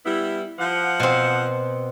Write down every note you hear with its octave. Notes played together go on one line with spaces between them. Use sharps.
G3 B3 E4
F3 F#5
B2 C4